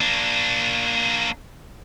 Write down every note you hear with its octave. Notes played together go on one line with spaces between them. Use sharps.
A#3 D4